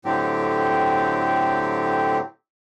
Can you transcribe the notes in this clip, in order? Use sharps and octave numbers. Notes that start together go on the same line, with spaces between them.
A2 D3 F#3 C4 G4